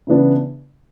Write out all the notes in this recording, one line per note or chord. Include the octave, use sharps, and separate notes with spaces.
C#3 E3 B3 D4